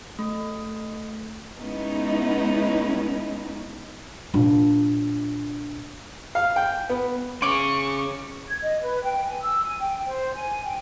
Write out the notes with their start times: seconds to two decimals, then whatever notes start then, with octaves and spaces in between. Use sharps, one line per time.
0.19 A3
1.59 G#3 B3 C#4 D#4 E4
4.34 A#2 D4
6.35 F5
6.56 G5
6.90 B3
7.42 C#4 G#4 C#6 D6 D7 F#7
8.49 G#6
8.62 D#5
8.82 B4
9.03 G5
9.25 G#5
9.42 E6
9.63 G#5
9.79 G5
10.07 C5
10.34 G#5
10.65 G5